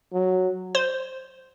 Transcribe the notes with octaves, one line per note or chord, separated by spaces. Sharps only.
F#3
C5